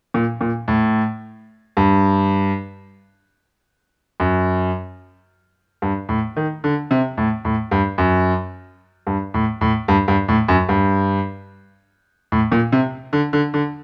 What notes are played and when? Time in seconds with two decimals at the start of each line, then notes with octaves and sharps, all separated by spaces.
0.14 A#2
0.41 A#2
0.68 A2
1.77 G2
4.20 F#2
5.82 G2
6.09 A2
6.36 D#3
6.64 D3
6.91 C3
7.18 A2
7.45 A2
7.71 G2
7.98 F#2
9.07 G2
9.34 A2
9.61 A2
9.88 G2
10.08 G2
10.29 A2
10.48 F#2
10.69 G2
12.32 A2
12.52 A#2
12.72 C3
13.13 D3
13.33 D3
13.54 D3